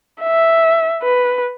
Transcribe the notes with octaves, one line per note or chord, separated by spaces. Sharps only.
E5
B4